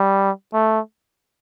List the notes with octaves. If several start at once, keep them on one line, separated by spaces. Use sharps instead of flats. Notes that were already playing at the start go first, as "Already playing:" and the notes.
Already playing: G3
A3